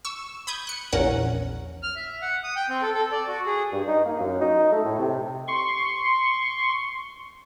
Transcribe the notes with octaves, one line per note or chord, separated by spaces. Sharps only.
C#6 E6
B5 D#6 G6 G#6
F#6 C#7
A#1 E2 C#4 A#4 F#5
F6
E5
F#5
D#6
G5
C4
A4
A4
D5
F#4
G#4
G2
D#4
A#3
F#2
D#4
A3
A2
C3
C6 C#6